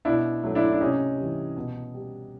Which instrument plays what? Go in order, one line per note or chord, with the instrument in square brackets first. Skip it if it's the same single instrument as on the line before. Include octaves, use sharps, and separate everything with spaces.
[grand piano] B2 D4 E4
F#3 A3
D4 E4
D4
C3 C#4 D#4
G3
E3
B2
G3